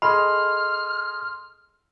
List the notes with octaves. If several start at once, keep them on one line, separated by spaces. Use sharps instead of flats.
G#4 A4 D#5 B5 C6 F6